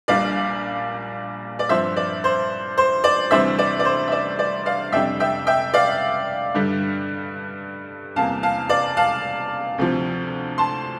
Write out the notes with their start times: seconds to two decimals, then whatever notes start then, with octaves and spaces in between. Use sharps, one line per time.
0.08 A#1 A#2 G3 D4 D5 F5
1.59 D5
1.69 G2 F3 C4 C5 E5
1.96 D5
2.24 C5
2.78 C5
3.04 D5
3.31 D2 C3 E3 G3 D4 C5 E5
3.59 D5
3.79 D5
3.85 C5
4.08 E5
4.12 D5
4.39 D5
4.66 D5 F5
4.92 F2 C3 G3 D4 E5 G5
5.20 E5 G5
5.47 E5 G5
5.74 D5 F5
6.54 G2 D3 G3
8.16 E2 C3 G3 A#3 F5 A5
8.43 F5 A5
8.69 D5 F5
8.97 F5 A5
9.78 D2 C3 F3
10.58 A5 C6